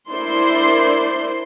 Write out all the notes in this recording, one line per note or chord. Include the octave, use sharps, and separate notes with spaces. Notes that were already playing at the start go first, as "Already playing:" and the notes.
D4 E4 A#4 C5 D5 C6